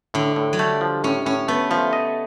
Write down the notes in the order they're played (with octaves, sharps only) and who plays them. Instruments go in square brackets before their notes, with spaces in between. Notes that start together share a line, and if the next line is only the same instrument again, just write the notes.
[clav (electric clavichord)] A2 [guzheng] D3
[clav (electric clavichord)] A2
[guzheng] F#3
[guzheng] G3 [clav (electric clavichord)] A3
[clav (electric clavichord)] F3
[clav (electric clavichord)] A2 [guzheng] C#4
[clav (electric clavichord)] A2 [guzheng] C#4
[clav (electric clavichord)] A3 [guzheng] B3
[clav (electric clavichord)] F3 [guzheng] A3
[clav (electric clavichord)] D#5